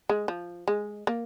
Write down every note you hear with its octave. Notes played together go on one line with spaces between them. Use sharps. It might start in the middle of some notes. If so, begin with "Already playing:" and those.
G#3
F3
G#3
A#3